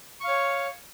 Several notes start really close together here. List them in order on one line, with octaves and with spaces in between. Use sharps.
C#6 F5 C#5